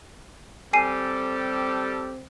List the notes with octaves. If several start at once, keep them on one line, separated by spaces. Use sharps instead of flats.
G3 C4 G4 A4 G#5 C7 D#7